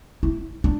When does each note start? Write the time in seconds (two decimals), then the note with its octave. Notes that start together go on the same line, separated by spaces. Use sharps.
0.23 E4
0.64 D4